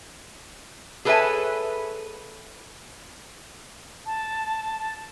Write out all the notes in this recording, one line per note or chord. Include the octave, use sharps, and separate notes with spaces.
G#4 A4 B4 C#5 E5 G#5
A5